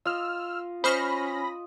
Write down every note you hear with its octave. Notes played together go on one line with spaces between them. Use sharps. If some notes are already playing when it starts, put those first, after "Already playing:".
F4 D#5 E6 F6
C#4 C5 D#5 B5 C#6 F6 A#6